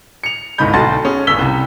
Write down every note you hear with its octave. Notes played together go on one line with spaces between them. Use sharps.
C#7 F7
G1 C2 G#2 D#5 B5 G6
B1 D3 F#4 A5 C6 A6
C#4 G#4
D1 G1 D2 E6 B6 G7
C2 C3